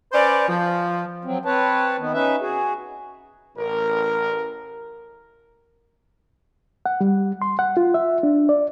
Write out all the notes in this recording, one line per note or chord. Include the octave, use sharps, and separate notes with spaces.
C#4 B4 C5 D5
F3
F#3 C4
C4 B4 C#5 A5
D#3 B3
C#4 D#4 B4 E5
F#4 G#4
A1 A#4
F#5
G3
C6
F#5
F4
E5
D4
D5